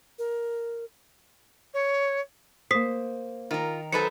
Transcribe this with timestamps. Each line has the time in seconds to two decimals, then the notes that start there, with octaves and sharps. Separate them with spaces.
0.18 A#4
1.73 C#5
2.71 A#3 C5 D#6 B6 C7
3.51 D#3 F4 A#4
3.92 F#3 D#4 A4 B4 C5 E5 C#7